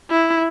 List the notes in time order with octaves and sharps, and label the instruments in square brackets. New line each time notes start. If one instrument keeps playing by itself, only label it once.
[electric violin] E4